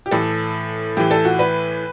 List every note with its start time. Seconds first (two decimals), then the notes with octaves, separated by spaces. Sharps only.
0.06 G4
0.11 A2 E3 A4
0.97 A2 E3 G4
1.11 A4
1.25 F#4
1.39 B4